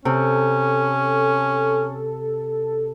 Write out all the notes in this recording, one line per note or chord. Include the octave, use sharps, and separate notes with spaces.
C3 C#4 A4